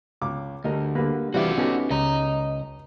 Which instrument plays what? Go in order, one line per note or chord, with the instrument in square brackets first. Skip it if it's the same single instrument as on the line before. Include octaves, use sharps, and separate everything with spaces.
[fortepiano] C#2 D6
[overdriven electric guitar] D2 [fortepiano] G3 A#4 D#5
[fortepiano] D3 G3 B4 [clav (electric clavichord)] A#3
[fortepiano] C2 F4 E5 [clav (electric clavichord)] E3 G3 [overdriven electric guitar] F#4 D5
[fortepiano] G3 G4 A4 [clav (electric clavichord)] B3 C#4 D#4
[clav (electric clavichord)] C#2 [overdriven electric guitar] D#5 A#5